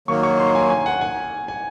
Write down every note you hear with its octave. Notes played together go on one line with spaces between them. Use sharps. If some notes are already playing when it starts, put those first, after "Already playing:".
D#3 F#3 A#3 C#6
C#6
C6
G#5
G#5
F#5
G#5
G#5